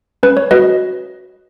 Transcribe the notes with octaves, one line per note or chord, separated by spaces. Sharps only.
C#4 B4
C#5
F#4 B4 D#5